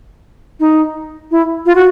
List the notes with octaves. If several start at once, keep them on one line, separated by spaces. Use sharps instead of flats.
D#4
E4
F4
F#4